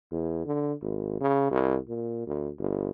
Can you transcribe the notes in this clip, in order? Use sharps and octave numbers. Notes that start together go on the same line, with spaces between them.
E2
D3
G#1
C#3
C2
A#2
D2
G1